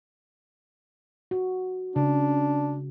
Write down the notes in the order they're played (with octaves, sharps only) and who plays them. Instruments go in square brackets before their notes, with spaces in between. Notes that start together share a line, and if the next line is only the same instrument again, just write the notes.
[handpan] F#4
[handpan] C#3 [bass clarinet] D4